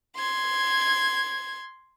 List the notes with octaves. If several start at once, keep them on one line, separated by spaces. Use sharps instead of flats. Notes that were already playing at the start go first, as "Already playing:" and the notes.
C6 G#6